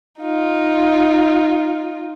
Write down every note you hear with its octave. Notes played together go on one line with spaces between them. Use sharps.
D#4 F4